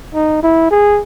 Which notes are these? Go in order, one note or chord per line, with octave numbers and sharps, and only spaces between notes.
D#4
E4
G#4